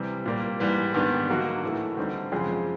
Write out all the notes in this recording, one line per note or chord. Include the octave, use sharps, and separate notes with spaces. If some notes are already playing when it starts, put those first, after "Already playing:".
Already playing: C3 E3 G3 C4
A#2 G3 A#3
G#2 E3 G3
G#2 D#3 G3 B3 D4
D3 F#3 A#3 D#4 F#4
A2 E3 A3
D3 G3 C4 D#4
F#2 C#3 F3 G#3 C4